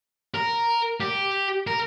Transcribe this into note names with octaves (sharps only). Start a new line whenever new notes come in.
A#4
G4
A#4